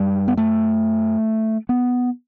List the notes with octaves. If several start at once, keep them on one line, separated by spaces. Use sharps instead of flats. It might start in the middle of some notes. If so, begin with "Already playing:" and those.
Already playing: F#2 G3
B3
A3
B3